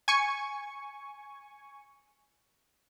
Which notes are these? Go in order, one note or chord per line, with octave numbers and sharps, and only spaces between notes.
G#5 C#6